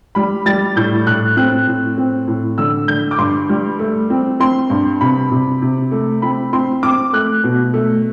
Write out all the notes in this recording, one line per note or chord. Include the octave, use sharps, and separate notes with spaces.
G3 B5
G3 A6
A2 G6
A2 F#6
C4 F#6
A2
C4
A2
D3 E6
D3 G6
D6
G2 C6
G3
A3
C4
C4 C6
G2
C3 B5
C3
C3
A3
C4 B5
C4 C6
C4 D6
A3 F#6
B2
A3